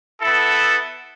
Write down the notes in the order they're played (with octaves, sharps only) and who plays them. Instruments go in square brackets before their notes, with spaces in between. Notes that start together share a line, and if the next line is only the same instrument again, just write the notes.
[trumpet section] B3 E4 A4